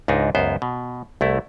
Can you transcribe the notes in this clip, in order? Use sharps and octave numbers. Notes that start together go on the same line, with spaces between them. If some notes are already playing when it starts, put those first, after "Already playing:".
C#2 G#2 D4 D#4
C#2 F#2 B3 C5
B2
C2 A3 E4